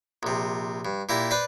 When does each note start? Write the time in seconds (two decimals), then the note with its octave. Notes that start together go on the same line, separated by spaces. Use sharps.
0.23 A#1 C3
0.85 G2
1.09 A#2 E4 G4 A#5
1.31 B4 C5 D5 B5